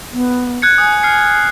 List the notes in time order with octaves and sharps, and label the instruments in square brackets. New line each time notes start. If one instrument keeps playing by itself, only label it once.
[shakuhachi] B3
[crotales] F#6 G#6 C#7
[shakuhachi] G#5 [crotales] D#6
[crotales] F6 C7 C#7